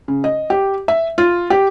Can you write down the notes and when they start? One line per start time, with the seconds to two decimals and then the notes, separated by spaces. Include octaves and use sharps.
0.08 C#3
0.24 D#5
0.50 G4
0.88 E5
1.18 F4
1.50 G4